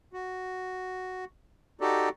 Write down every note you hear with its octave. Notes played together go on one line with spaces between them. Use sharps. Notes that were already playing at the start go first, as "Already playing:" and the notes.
F#4
D#4 F#4 G4 A4 D5